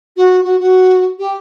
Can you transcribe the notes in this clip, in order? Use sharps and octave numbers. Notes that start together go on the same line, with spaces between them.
F#4
F#4
F#4
G4